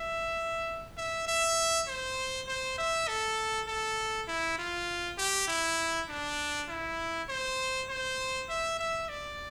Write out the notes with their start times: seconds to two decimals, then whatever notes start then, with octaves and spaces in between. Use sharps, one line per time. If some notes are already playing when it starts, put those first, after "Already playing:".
Already playing: E5
0.97 E5
1.27 E5
1.87 C5
2.48 C5
2.78 E5
3.08 A4
3.68 A4
4.28 E4
4.58 F4
5.18 G4
5.48 E4
6.08 D4
6.68 E4
7.29 C5
7.89 C5
8.49 E5
8.79 E5
9.09 D5